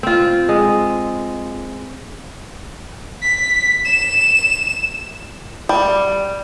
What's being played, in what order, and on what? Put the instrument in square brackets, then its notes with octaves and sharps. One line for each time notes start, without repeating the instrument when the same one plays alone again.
[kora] C4 F4
G#3
[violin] B6
E7
[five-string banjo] G3